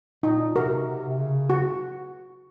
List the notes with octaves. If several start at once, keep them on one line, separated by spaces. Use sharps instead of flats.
A#2 D#4
C3 F#4 A#4
C3
C3
C#3
F#4